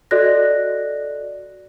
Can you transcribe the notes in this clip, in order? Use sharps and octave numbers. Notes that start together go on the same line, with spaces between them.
F#4 A4 D5 D#5 F#6 A#6